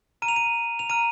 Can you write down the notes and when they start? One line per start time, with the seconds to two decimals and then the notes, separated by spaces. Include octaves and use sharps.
0.22 A#5 F6 D#7
0.28 F7
0.36 D#7
0.79 F7
0.90 A#5 F6 D#7